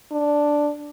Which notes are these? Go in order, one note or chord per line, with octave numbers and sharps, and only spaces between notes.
D4